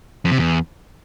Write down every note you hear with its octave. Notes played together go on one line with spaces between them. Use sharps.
F2
C3
E2